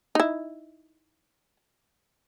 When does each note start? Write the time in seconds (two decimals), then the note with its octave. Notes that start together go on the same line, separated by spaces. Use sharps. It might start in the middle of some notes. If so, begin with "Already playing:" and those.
0.15 D#4 E4